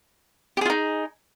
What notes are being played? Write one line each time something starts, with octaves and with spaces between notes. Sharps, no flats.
D#4 F4 G4 G#4